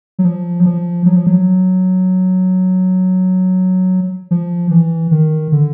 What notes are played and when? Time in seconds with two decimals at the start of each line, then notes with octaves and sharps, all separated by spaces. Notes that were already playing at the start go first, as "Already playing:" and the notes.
0.19 F#3
0.25 F3
0.60 F#3
0.66 F3
1.06 F#3
1.16 F3
1.27 F#3
4.31 F3
4.71 E3
5.11 D#3
5.52 D3